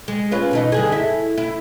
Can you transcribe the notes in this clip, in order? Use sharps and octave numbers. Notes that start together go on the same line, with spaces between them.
G#3
C#4 F4 B4
B2 E3 D#4
G2 D3 G#4
E4
E4